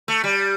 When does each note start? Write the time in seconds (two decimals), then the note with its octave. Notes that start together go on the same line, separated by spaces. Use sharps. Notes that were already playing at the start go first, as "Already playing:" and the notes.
0.08 A3
0.24 G3